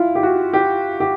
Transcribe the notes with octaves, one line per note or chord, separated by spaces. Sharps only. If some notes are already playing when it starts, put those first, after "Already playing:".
Already playing: E4 F4
G4
F#4
G4
G4